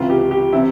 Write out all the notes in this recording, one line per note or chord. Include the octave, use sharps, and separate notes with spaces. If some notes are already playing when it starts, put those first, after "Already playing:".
Already playing: C#2 C3 E3 F4
G4
G4
C3 E3 E4